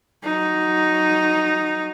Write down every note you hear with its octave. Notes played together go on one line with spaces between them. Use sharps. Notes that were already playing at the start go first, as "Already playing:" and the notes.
F#3 D#4